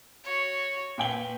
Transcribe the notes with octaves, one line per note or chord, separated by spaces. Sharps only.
F#4 C#5
A#2 B4 G5 G7